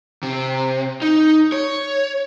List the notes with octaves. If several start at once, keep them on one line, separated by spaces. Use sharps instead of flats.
C3
D#4
C#5